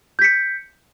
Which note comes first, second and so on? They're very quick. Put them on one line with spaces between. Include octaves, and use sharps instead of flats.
G6 B6 C#7